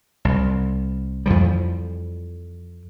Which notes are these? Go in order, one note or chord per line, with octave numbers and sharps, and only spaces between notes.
C2
F2 E3 F3 G3